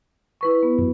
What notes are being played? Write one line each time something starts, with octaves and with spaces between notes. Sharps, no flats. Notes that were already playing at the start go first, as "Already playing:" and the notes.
E4 B4 C#6
B3
F#2